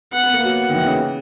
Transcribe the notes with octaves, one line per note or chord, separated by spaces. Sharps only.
B3 F#5
B3
A#3
F#3
F#5
D#3
E3
C#3